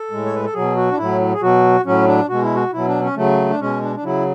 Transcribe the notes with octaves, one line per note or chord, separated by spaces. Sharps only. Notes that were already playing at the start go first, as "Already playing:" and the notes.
Already playing: A4
A2 G#3
C#5
B4
A4
B2 F#3 G#4
F#4
D4
A2 F#3 E4
G#4
B2 F#3 F#4
A2 F#3 C#4
D4
B2 G#3 F#4
E4
F#4
B2 F#3 E4
D4
C#4
C#3 F#3 A3
D4
B2 G#3 C#4
D4
D4
C#3 F#3 E4